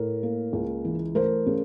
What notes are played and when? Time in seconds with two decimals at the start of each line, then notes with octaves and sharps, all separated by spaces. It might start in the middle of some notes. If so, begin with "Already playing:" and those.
Already playing: A2 A#4
0.23 A#3
0.53 C#2
0.85 E3
1.15 A3 A#4 C5
1.46 C#3